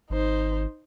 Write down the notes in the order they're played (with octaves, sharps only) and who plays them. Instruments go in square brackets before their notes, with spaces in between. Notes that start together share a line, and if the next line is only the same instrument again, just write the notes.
[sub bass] G#1 [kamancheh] D#4 C5